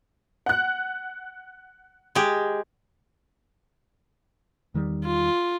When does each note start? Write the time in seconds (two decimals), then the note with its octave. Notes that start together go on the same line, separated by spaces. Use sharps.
0.46 F#5 F#6
2.15 G#3 G4
4.74 E2 D#3 G3
5.05 F4